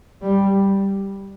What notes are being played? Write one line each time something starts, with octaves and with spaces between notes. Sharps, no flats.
G3